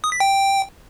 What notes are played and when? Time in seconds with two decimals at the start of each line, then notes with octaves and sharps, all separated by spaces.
0.04 D#6
0.12 B6
0.20 G5